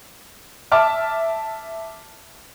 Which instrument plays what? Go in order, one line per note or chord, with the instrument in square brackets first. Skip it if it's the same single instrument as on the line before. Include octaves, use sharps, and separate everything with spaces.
[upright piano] E5 A5 D6 F6